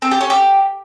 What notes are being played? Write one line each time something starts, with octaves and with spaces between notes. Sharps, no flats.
C4
G4
C#4
G4